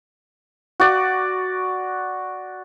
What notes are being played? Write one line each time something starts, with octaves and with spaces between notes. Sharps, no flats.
F#4 D5